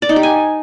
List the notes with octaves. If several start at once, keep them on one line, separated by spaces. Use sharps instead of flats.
D5
D#4
G4
G#5